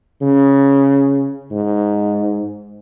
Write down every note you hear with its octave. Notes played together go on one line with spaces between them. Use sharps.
C#3
G#2